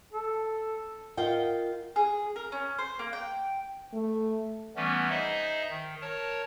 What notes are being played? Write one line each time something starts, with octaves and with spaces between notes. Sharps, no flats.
A4
F4 A#4 D#5 F#5 G5
G#4
A#4
C#4
C5
A#3
G5
A3
E3 G3 A3 B3 C#4
D#4 G#4 C5 D#5 E5
D#3
A#4 C#5 A5